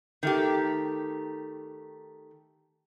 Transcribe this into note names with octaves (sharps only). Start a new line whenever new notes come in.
D#3 A3 G4